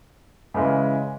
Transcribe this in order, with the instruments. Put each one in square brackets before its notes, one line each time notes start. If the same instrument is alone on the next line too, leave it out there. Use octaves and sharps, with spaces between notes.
[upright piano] C#3 E3 G#3